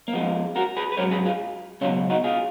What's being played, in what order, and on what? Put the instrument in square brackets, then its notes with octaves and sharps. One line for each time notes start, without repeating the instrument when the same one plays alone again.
[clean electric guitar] A#3
F2 F3 G#3 B3
F#4 A#4
G#4 B4
B4
G#2 F#3 A#4 C#5
G#4 B4
F4 G#4
C#2 B2 F#3 C#4 F4
D#4 F#4
F4 G#4